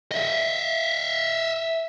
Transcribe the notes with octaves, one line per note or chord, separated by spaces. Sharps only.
D#5 E5